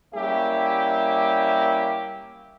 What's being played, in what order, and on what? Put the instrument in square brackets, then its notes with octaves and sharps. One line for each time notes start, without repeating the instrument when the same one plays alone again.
[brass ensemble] G3 A#3 C#4 E4 G4 E5